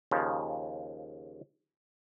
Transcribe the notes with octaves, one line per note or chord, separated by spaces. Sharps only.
D#2 C#3 F3